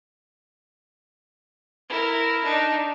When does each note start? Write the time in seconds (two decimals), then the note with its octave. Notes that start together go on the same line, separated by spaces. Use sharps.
1.89 E4 A#4
2.44 D4 D#4